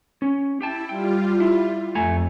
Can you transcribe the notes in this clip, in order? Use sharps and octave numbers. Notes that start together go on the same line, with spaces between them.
C#4
E4 G4 G5 A5
G3 F4 G5
E4
F2 A3 G#5 A#5